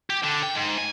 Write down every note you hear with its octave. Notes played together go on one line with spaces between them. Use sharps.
G4
D3
G5
G#2
G#5